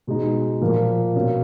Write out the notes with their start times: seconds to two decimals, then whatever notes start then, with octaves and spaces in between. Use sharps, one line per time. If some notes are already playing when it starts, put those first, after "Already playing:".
0.07 B2 G#3 D#4
0.61 A#2 F3 A#3
1.15 B2 A#3 C#4